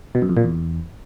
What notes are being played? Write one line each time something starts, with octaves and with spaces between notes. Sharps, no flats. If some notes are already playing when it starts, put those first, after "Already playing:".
B2
F#2
F2
A#2
E2